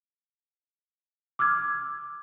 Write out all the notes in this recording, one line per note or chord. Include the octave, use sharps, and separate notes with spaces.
D6 E6 F6 G#6